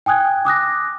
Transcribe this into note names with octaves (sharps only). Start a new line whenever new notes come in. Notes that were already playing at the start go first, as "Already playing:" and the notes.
G5 G#5 D#6 F#6 G#6
D6 D#6 F#6 A#6